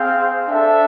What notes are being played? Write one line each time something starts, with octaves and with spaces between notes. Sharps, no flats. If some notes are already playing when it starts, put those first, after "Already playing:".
Already playing: C4 G#4 C5 F5
D4 A4 E5